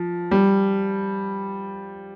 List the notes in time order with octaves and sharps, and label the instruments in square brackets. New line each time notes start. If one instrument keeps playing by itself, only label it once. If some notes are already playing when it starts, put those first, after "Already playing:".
Already playing: [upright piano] F3
G3